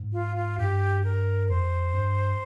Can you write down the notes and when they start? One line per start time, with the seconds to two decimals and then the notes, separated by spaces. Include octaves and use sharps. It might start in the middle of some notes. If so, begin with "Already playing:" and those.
Already playing: G#2
0.13 F4
0.36 F4
0.58 G2 G4
1.04 A#4
1.49 F2 C5
1.93 G2